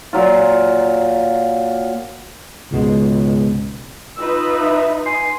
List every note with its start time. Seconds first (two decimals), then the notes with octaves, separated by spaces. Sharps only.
0.13 A#2 F#3 F4
2.72 C#2 G#2 B2 G#3
4.17 D#4 F4 B4 E6
4.60 E5
5.06 G#5 C6